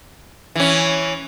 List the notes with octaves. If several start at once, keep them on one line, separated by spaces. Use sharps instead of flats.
E3 C#4